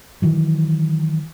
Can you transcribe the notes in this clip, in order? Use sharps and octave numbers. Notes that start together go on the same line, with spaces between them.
D#3 E3 F#3